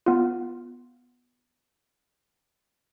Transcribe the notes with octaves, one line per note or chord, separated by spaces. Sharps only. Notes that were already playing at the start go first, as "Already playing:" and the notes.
B3 F4